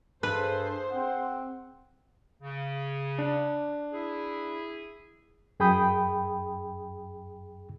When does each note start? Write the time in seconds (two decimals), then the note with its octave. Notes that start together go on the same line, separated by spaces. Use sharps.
0.23 G2 G#4 A4 B4 C5
0.91 C4 F#5
2.42 C#3
3.18 D4
3.92 E4 G#4
5.60 F#2 G#4 G5 B5 D#6 G6